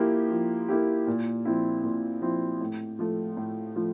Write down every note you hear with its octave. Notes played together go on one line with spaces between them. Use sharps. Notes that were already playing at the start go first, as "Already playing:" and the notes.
Already playing: F3 A#3 E4 G4
F3
A#3 E4 G4
A#2
F3 C4 E4
A#2
F3 C4 E4
A2
F3 A3
A2
F3 A3